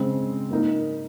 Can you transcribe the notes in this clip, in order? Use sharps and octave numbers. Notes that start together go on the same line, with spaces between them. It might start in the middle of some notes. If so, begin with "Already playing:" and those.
Already playing: C#3 G#3 C4
A#3 D#4 A#4